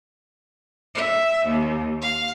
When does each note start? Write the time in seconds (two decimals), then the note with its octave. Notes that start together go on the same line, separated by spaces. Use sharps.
0.94 E5
1.45 D#2
1.99 F5